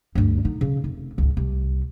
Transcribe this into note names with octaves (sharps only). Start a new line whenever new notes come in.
D2 G2
D3 D#4
C#3
F1
C#2 G#2
C2